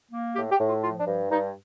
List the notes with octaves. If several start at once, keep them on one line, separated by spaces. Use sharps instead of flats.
A#3
A2 G4
G4
A2
F4
F3 F4
D4
G2
G2 D#4